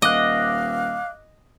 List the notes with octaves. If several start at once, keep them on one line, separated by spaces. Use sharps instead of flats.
D#1 D#5 F5 D6 F#6